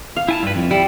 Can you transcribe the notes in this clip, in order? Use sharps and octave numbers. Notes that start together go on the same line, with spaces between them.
F5
E4 G#5 A5
G2 B4
F2
G3 E4